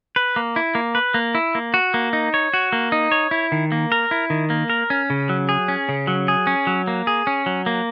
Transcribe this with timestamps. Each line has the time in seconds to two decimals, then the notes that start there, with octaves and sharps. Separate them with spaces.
0.16 B4
0.36 A#3
0.56 E4
0.75 A#3
0.95 B4
1.14 A#3
1.35 E4
1.55 A#3
1.74 F#4
1.94 A#3
2.13 D#4
2.34 C#5
2.54 F#4
2.73 A#3
2.92 D#4
3.12 C#5
3.31 E4
3.52 D#3
3.72 A#3
3.92 A#4
4.11 E4
4.30 D#3
4.50 A#3
4.70 A#4
4.90 C#4
5.10 C#3
5.29 F#3
5.49 G#4
5.68 C#4
5.89 C#3
6.07 F#3
6.28 G#4
6.47 C#4
6.67 F#3
6.87 A#3
7.07 G#4
7.27 C#4
7.46 F#3
7.66 A#3